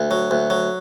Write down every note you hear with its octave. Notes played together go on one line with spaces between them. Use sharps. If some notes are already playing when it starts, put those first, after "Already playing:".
Already playing: D2
F#3
D2
F#3